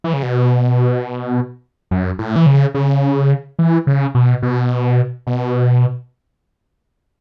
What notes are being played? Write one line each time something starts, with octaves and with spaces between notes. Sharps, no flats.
E3
C#3
B2
F#2
A2
E3
C#3
C#3
E3
C#3
B2
B2
B2